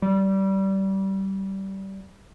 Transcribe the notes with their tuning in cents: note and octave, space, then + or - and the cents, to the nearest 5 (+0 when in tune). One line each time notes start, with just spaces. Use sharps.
G3 -20